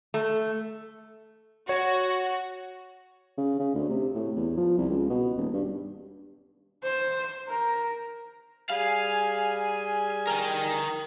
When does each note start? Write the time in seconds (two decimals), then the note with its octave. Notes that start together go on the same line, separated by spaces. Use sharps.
0.14 A3
1.69 F#4 C#5
3.38 C#3
3.59 C#3
3.75 D2
3.89 C3
4.15 A2
4.36 E2
4.57 F3
4.78 C2
4.89 C#2
5.10 B2
5.36 D#1
5.54 G2
6.83 C5
7.48 A#4
8.70 G3 G#4 F5 G#5
10.27 A#4 G5